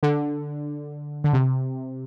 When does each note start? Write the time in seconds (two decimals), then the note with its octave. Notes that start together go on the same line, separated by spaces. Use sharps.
0.03 D3
1.24 D3
1.33 C3